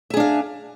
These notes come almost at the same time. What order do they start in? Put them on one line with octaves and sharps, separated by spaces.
E5 G#4 D4 F5